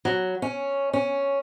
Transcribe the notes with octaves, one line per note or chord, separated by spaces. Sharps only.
F#3
C#4
C#4